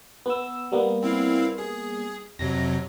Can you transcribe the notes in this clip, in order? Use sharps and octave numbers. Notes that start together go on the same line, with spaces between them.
B3 E6
G3 A#3 B3
C4 E4 F5
G#4
F2 C3 F#3 A#6